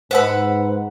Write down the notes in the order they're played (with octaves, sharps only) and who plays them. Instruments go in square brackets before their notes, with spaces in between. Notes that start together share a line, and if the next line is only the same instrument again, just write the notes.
[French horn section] G#2 [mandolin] B4 F#5 B5 [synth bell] C5 E6